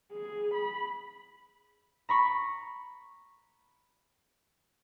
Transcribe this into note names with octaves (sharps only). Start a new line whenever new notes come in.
G#4
B5
A#5 B5 C#6